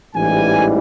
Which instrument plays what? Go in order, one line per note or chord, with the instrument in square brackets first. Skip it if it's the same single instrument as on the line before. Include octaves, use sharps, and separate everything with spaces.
[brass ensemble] A1 G#2 E3 G3 G#5